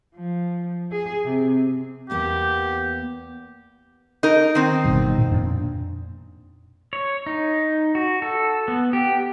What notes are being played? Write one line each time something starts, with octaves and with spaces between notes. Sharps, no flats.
F3
G#4
C3
E2 A#3 B3 G4
D#4 A#4
D#3 C4
G1 B2 G3
A#2
F2 A#2 D4
C#5
D#4
F#4
A4
B3
G4